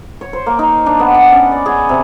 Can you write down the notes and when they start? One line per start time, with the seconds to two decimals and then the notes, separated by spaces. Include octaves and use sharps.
0.21 C#5
0.33 C5
0.46 A#3
0.59 D#4
0.86 D4
1.00 B3
1.14 F#5
1.32 C#4
1.52 D5
1.66 G#4
1.89 C3